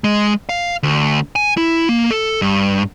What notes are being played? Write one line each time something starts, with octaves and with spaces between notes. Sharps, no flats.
G#3
F5
D2
G#5
E4
A#3
A4
G2